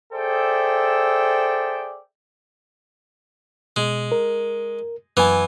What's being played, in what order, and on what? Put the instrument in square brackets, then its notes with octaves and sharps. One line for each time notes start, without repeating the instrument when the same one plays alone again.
[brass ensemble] G#4 A4 C5 D5 E5 G5
[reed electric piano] B2 [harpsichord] G#3
[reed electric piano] A#4
[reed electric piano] F#2 G#5 [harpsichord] E3 B3